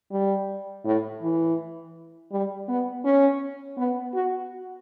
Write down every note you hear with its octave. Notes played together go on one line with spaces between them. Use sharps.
G3
A2
E3
G3
B3
C#4
B3
F#4